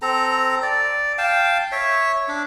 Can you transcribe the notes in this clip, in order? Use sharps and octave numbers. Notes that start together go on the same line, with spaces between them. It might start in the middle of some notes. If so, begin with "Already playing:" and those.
C4 A4 A#5
D5
F5 G5 A5
C#5 E5
D4